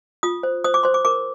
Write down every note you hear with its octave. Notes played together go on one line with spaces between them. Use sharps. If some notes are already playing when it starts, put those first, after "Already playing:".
F4 D#6
C5
C5 D#6
D6
C5 C6
D6
A#4 D6